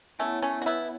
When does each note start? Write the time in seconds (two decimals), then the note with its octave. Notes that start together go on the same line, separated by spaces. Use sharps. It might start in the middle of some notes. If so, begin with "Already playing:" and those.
0.19 A3 B3 C#4 E4 C#5 F#5
0.42 A3 C#4
0.62 F#4
0.66 B3 E4